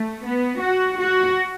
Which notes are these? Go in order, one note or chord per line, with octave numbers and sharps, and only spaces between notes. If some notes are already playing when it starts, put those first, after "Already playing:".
Already playing: A3
B3
F#4
F#4